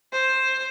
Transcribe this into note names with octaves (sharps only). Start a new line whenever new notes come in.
C5